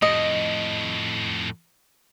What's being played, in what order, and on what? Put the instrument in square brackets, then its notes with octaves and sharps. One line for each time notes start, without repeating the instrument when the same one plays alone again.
[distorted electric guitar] F2 A2 [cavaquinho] D#5